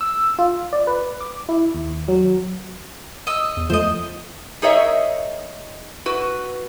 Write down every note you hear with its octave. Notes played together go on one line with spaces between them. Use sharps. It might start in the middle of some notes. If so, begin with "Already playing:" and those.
E6
F4
D5
B4
D6
E4
D#2
F#3
D#5 E6
E2
F3 A3 C5 D#5
D#4 G#4 A#4 C#5 D#5 E5
F#4 B4